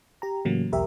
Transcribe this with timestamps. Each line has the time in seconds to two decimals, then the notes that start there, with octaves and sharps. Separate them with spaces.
0.22 G4 A#5
0.45 A2 C#3 E3 F#3 A#3
0.73 B1 E2 G4 A#4 E5